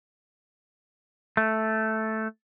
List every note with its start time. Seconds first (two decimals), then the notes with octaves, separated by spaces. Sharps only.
1.37 A3